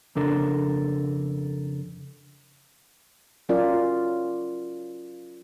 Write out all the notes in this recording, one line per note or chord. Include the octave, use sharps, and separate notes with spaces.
F2 C#3 D4 A4 A#4
F#3 C#4 F4 A#4 D5